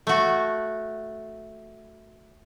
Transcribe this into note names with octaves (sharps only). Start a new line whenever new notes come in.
A3 F#4